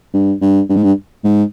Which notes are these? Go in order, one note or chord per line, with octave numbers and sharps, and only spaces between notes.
G2
G2
G2
G#2
G2
G#2